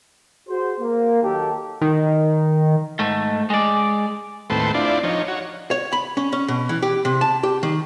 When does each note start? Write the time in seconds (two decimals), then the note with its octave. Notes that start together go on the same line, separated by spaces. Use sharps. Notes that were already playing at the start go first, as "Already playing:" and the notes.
0.49 F#4 G#4 C5
0.80 A#3
1.22 D#3 F#3 G4 A4
1.82 D#3
2.99 G#2 A3
3.50 G#3 D5
4.50 D#2 A2 C4 A4 B4 C6
4.74 D4 E4 F4 C5 D5
5.03 F3 D#4 C#5
5.28 F#4 C#5
5.71 C#5
5.93 B5
6.17 C#4
6.32 C#4
6.48 B2
6.69 E3
6.82 G4
7.05 C3
7.21 A5
7.43 G4
7.63 D#3